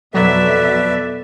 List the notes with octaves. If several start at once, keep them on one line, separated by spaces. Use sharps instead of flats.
F2 B2 F#3 A4 B4 D5 E5